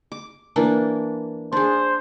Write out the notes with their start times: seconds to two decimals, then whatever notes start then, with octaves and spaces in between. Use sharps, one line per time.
0.12 D6
0.56 E3 A#3 D4
1.52 D4 G#4 C5